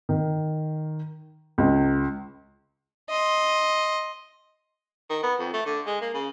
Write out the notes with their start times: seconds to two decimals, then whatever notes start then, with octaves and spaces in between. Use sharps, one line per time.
0.09 D#3
1.58 C#2
3.10 D#5 C6
5.10 D#3
5.23 B3
5.39 F2
5.53 A3
5.66 D3
5.86 G#3
6.01 A#3
6.14 C#3